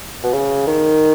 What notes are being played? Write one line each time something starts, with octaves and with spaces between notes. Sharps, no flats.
B2
C#3
D#3